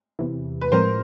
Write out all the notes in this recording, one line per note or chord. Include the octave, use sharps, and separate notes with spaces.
E2 C3 E3
B4
A2 F3 G#3 C4 A#4 C5